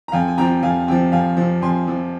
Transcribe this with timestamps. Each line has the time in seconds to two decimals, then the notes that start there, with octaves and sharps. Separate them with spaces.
0.08 A#5
0.12 F2 F5 G#5
0.27 G#5
0.38 C3 F3 G5 A#5
0.63 F2 F5 G#5
0.88 C3 F3 G5
1.12 F2 F5 G#5
1.37 C3 F3
1.62 F2 G#5 C6
1.87 C3 F3